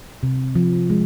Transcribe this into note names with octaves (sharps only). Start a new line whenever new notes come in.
C3
F3
G#3